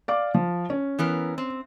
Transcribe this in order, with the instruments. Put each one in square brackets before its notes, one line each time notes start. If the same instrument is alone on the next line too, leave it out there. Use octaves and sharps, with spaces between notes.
[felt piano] D5 F5 D6
F3
C#4
[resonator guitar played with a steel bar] E3 B3 A#4
C4